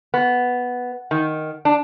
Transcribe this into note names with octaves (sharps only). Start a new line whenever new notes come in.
B3
D#3
D4